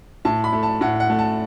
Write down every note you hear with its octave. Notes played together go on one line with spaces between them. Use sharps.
A2 A5
B5
A3
A5
A2 F#5
F#5
A3
A5